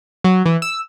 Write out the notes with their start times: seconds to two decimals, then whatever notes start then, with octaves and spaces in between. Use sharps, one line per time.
0.24 F#3
0.46 E3
0.62 E6